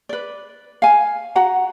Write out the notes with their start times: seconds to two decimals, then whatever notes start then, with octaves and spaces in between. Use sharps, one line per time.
0.09 B4 D5
0.82 F5 G#5
1.36 F#4 F#5 A#5